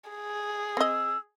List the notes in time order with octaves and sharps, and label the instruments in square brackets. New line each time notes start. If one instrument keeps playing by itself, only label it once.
[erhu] G#4
[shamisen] C4 D#5 [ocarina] E6